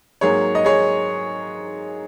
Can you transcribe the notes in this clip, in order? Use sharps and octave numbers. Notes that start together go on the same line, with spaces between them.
G#2 F#3 A#3 G#4 C#5
D#5
G#4 C#5